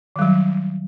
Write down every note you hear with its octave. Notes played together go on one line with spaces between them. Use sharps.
D#3 F#3 G3